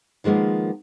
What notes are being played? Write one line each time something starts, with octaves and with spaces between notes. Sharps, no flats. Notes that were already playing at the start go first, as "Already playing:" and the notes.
D#3 F3 G#3 A#3 B3